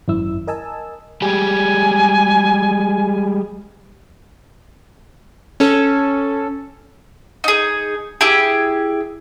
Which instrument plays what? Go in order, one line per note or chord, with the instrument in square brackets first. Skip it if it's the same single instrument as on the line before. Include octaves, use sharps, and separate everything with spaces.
[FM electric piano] G#1 F#2 E4 E6
A#4 D#5 G#5 A5 E6
[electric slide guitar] G3 G#3 G4 [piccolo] G#5
[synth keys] C#4 A4
[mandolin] D#4 G#4
E4 G4 G#4